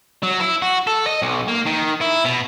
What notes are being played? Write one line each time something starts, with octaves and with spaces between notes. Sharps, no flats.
F#3
E4
F#4
A4
D#5
B1
A#3
D#3
E4
B2